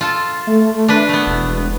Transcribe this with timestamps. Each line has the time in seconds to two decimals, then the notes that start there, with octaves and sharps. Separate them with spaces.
0.01 F4 A4
0.47 A3
0.88 D4 B4
1.09 A3 B3
1.27 E1